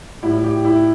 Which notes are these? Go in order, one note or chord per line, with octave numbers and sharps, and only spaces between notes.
A2 G3 E4
G4
E4